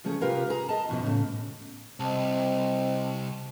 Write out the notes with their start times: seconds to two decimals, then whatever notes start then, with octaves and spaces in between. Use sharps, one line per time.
0.04 C#3 F3 A3 C#4 G#4
0.21 C3 F4 G4 A#4 B4 F5
0.50 G#4 A#5
0.69 D#5 A5
0.89 E2 B2 F3
1.03 A2 C#3
2.00 C2 C4 D#5 A5